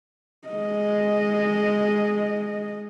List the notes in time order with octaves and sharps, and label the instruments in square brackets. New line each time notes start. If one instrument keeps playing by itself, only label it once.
[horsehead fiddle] G#3 D#5